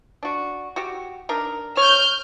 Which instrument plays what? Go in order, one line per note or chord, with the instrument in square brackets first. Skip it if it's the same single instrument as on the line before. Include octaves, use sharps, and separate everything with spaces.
[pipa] D4 F#4
F#4 G4
D4 D#4 A#4
[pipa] C#5 [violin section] F6 G6